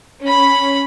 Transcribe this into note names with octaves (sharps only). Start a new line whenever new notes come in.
C#4 B5